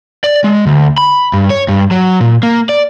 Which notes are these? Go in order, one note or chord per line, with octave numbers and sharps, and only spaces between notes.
D5
G#3
D2
B5
G2
C#5
G2
F#3
A#2
A#3
D5